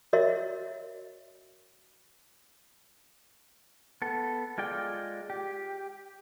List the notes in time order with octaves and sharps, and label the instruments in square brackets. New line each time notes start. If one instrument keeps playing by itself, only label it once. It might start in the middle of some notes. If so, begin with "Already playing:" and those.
[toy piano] F#4 A#4 C#5 D#5 E5
[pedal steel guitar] B3 A4
G#3 F4 D5 G5
G4